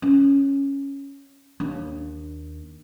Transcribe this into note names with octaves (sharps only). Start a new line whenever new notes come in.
C#4
D#2 D4